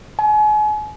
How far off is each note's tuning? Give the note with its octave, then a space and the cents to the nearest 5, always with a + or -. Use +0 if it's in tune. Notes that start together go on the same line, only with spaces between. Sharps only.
G#5 +35